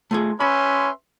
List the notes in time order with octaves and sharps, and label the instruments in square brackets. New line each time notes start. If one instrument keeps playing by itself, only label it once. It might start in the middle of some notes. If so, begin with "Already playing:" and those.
[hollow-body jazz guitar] A3 F4 G#4
[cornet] C#4 [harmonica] B4 E5 C6 [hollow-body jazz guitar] B5